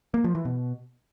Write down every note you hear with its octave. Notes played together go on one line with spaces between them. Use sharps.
A#3
F3
E3
B2